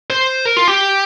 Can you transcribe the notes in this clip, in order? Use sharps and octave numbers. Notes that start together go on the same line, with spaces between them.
C5
A#4
F4
G4